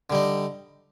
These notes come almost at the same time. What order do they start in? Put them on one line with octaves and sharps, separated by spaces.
D3 G3 D#4